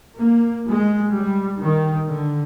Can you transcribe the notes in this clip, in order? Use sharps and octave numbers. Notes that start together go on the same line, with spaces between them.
A#3
G#3
G3
D#3
D3